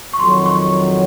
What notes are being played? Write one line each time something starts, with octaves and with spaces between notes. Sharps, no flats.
C#6
F2 D#3 F#3 C6
C6
C#6